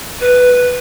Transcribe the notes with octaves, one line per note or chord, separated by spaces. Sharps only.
B4